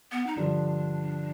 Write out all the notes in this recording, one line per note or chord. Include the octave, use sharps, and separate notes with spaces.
B3
D#4
G2 D3 F3 D4